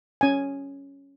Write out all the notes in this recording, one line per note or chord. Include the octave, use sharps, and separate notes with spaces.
C#4 G#5